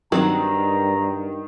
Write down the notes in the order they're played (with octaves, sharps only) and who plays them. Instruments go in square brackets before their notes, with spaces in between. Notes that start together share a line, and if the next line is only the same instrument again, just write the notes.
[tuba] G2 [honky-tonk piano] D#3 [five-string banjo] F#3 C4 F#4 [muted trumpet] A#5